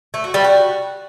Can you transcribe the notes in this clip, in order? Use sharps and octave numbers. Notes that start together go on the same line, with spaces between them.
A3
F#4
G3
F#4